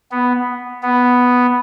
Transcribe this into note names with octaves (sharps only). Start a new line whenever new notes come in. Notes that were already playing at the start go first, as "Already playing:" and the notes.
B3
B3